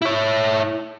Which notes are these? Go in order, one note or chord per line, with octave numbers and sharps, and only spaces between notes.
E4 C#5